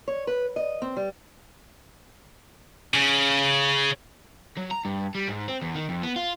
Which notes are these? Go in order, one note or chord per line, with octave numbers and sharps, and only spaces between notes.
C#5
B4
D#5
C4
G3
C#3
F#3
A#5
G2
G3
G#2
C4
E2
D#3
F2
B3
F4